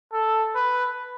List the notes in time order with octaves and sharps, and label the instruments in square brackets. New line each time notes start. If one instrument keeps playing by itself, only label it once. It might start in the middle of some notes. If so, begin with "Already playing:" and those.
[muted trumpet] A4
B4